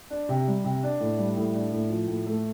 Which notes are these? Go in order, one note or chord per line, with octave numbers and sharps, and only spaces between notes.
D4
C3
G3
C3
D4
A2
G3
A2
D4
A2
F3
A2
A3